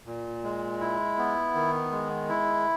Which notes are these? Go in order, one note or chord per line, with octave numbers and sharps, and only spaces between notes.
A#2
G#3
E4
B3
D#3
G#3
E4